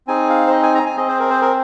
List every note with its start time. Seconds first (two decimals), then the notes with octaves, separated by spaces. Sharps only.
0.07 C4 D#4 G#4 G#5
0.29 F5
0.47 C5
0.51 D#5
0.63 G#5
0.75 A#5
0.86 G#5
0.97 C4 G#4 D#5
1.08 C5
1.20 A#4
1.30 C5
1.42 A#4